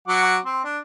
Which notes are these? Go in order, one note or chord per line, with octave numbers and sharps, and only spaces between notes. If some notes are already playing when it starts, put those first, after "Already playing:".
F#3 F#5 D6
C4 C6
D4